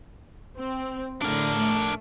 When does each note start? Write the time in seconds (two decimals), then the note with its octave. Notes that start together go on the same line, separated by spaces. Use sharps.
0.57 C4
1.22 A2 D3 D4 A#4
1.57 A3